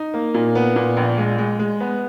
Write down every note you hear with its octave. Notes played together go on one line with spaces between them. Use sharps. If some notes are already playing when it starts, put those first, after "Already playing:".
Already playing: D#4
A#3
A#2
B3
A#2
A#1
G#3
G#3
G#3
B3